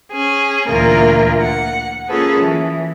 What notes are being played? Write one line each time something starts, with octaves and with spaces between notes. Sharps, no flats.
C#4 G#4
D2 A#2 E3 A#3 F4 A#4
F#5
A#3 C#4 F4 G#4 A4 B4
E3